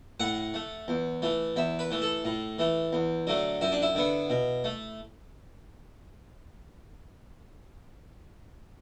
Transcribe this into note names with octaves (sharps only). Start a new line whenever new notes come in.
A2 F#5
A3
E2
E3 A3
E2 E5
B4
E3 A3
A4
A2
E3 A3
E2
D3 F#3 A3
F#2 E4
D4
E4
D3 B3
B2
A3